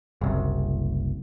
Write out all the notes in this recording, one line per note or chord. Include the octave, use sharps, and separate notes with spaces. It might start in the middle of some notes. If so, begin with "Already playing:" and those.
F#1 C2